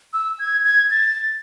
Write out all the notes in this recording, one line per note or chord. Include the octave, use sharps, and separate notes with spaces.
E6
G#6
G#6
A6